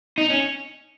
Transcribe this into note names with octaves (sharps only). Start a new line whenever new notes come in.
D#4
C#4